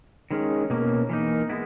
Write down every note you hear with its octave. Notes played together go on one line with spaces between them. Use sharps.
D#3 G#3 C#4
B2 A#3 C#4
E3 A#3 D#4
G#3 B3 E4